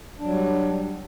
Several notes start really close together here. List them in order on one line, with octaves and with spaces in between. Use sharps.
D4 F#3 G3